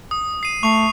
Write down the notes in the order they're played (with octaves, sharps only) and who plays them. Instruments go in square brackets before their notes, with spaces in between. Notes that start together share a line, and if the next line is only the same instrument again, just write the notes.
[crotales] D#6
C7 D#7
[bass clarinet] A3 [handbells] C#6 [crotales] C7 F7